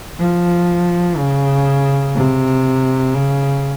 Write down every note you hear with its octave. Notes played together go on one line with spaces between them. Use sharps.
F3
C#3
C3
C#3